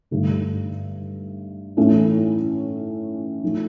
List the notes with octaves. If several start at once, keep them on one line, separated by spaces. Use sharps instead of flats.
G2 D3 A3
A2 E3 A3 C#4
F3 A3